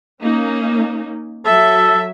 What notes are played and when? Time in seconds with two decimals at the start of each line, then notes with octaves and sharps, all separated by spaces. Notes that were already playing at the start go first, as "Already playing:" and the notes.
0.23 A#3 C#4 D#4
1.46 F#3 A4 E5